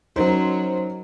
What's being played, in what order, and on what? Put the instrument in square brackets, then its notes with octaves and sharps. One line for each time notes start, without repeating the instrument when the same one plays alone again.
[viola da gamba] F#3 [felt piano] C#4 D#4 A#4 [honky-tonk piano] C5